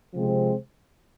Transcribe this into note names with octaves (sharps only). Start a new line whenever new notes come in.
C3 F3 G#3 C4